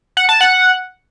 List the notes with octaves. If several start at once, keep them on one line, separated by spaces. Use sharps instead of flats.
F#5
A5
F#5